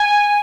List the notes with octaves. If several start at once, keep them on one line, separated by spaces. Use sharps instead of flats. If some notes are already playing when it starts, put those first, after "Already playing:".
Already playing: G#5